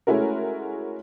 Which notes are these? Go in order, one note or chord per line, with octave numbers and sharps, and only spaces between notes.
G#3 A3 C#4 E4 F#4 A#4